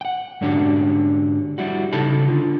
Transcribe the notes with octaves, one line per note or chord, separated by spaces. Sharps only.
F#5 G5
G#2 D3 C#4 D4 F#4 G4
G3 E4 F#4
C#3 D#4 A4 A5 B5
D3 F4